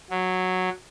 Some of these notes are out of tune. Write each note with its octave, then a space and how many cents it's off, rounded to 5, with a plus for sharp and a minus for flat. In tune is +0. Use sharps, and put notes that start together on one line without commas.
F#3 -5